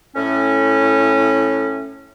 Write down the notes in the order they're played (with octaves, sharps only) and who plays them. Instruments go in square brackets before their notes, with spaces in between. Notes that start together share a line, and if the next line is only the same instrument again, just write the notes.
[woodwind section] A2 C#4